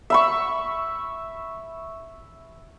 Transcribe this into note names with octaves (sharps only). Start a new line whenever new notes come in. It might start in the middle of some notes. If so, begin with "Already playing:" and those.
E5 B5 C#6